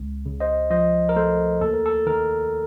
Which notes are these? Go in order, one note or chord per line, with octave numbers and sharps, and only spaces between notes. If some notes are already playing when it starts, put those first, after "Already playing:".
Already playing: C#2
C#3
C5 D#5
F3 C5 D#5
A#4
A3 A4 C5
D#2 A4
A#4
A4
D#3 A#4